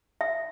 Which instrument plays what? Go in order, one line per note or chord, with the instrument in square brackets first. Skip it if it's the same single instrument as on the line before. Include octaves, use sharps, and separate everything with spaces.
[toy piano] E5